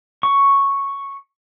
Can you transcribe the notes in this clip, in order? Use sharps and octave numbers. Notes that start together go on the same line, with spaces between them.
C#6